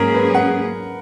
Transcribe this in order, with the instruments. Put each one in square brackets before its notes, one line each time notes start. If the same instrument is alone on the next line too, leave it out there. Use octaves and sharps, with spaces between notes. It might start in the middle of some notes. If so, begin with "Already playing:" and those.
Already playing: [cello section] G#2 F#3 A#3 C#4 G#4 [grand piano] A#4
[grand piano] B4
F#5